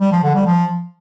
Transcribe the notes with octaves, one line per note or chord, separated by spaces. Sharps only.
G3
F3
D3
G3
F3